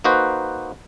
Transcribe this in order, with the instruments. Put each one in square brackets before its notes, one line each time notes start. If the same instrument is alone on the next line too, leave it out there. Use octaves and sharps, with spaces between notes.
[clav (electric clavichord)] A#3 D#4 F#4 B4 C5